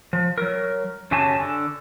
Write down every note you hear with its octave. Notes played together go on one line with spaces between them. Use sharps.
F3
F#3 A#4
F#2 C#3 F#3 G4 G#5 A5
D3